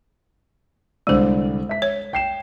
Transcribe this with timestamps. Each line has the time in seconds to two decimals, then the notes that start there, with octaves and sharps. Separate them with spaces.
1.07 C2 D3 G#3 C5 D5
1.69 E5 B6
1.82 C#5
2.13 G5 C7 E7